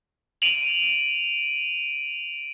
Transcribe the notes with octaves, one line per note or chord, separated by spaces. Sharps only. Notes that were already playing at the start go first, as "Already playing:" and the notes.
D7 D#7 F7 F#7